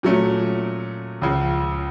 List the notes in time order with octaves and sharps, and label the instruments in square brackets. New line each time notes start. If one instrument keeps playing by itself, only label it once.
[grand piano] A#2 F#3 A3 C#4
C#2 C#3 F3